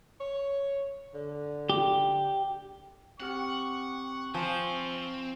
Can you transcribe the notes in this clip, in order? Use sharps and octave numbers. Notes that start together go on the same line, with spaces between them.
C#5
D3
G4
C4 G4 F#5 C#6 F6
F3 C4 F4 G#5